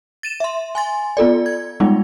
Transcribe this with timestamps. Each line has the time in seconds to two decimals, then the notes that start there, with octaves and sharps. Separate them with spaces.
0.23 A6 D#7 E7
0.40 E5 C6
0.75 G#5 C6 A6
1.17 B3 F4 A4 D5
1.46 G#6
1.80 G3 G#3 B3 D#4 F4